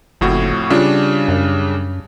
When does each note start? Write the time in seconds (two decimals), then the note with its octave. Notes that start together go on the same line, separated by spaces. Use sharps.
0.21 F#1 F2 A2 F#4
0.70 C#3 G3 D4 F4
1.28 F#2